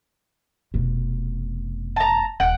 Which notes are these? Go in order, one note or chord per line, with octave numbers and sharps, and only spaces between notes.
F1 B2
A5 A#5
D#1 F#5 G5